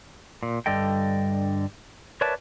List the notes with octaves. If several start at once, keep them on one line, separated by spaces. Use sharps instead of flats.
A#2
G2 D3 G3 A4 D#5 G5
A#4 B4 C#5 D5 E5 A5